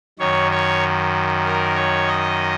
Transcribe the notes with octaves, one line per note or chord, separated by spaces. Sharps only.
F#2 D#3 C#5
C#5
A#4
C#5
D#5